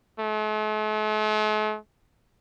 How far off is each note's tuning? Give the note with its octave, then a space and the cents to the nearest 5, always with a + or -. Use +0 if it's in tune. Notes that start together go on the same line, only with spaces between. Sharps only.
A3 -45